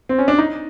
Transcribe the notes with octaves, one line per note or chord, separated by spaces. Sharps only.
C4
C#4
D4
D#4